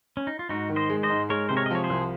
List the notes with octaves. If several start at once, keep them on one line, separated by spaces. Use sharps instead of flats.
C#4
D#4
F4
G#2 D#4 F#4
D#3
C5 D#5
G#3
C5 D#5
G#2
G#3 A#4 C#5
C3 C5
A#4 C#5
D#5
F3 C#5
G#4 C5
C2